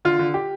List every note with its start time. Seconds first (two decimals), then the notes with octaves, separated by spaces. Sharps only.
0.05 D3 F4
0.19 D3
0.34 G4